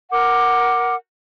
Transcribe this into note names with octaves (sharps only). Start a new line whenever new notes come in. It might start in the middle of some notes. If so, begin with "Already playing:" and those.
A#4 F#5 D6